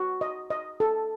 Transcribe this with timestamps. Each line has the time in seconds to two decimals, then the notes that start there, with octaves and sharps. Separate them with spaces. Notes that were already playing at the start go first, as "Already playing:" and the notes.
Already playing: F#4
0.21 D#5
0.50 D#5
0.80 A4